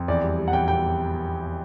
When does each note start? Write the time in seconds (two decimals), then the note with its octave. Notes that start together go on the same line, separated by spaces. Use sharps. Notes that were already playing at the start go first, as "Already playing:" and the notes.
Already playing: F2
0.08 E2 D5
0.23 G3
0.38 G3
0.48 F#5
0.53 E2 G5
0.68 G3 G5